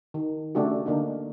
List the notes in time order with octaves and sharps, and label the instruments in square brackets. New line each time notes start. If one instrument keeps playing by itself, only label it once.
[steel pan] D#3
C#3 A3 D4 F#4 G4
D3 A#3 D4 D#4